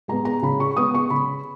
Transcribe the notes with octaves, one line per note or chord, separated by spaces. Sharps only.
G#3 B3 A#5
A#5
C#3 B5
C#6
G#3 B3 D#6
C#6
C#3 B5